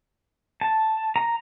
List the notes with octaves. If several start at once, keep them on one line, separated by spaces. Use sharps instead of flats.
A5
A#5